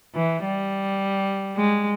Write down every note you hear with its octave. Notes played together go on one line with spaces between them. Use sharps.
E3
G3
G#3